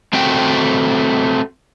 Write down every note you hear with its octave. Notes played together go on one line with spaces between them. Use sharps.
A3 C4 F#4 G5